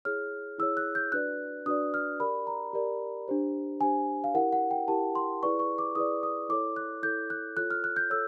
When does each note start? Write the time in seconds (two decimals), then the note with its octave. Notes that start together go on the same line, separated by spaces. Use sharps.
0.05 E4 G#4 C#5 F6
0.58 E4 G#4 C#5 E6
0.77 F#6
0.95 G6
1.12 D4 F#4 B4 D5 F#6
1.66 D4 F#4 B4 D5 D#6
1.94 F6
2.20 G4 A#4 D5 B5
2.47 A#5
2.73 G4 A#4 D5
3.28 D4 G4 C5
3.80 D4 G4 C5 G#5
4.24 F5
4.34 E4 G4 A#4 F#5
4.52 F#5
4.71 G5
4.88 E4 G4 A#4 A5
5.15 C6
5.43 E4 G#4 B4 D5 C#6
5.59 C#6
5.78 D6
5.95 E4 G#4 B4 D5 D#6
6.23 D#6
6.49 E4 A4 C#5 D6
6.76 F#6
7.03 E4 A4 C#5 G6
7.30 F#6
7.57 F4 A4 C#5 F#6
7.71 F6
7.84 F#6
7.96 G6
8.10 A4 C#5 E6